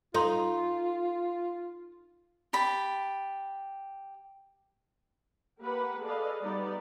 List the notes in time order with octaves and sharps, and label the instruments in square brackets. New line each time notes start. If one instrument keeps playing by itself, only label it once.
[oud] D#4 [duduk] F4 [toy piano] A4 C6
[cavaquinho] G4 A5 B5
[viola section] A#3 G4 B4 F#5 B5
G#4 A4 B4 D5 D#5 F5
G3 B3 D#4 D5